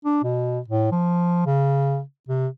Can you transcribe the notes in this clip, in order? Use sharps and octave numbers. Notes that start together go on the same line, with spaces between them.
D4
B2
A2
F3
C#3
C3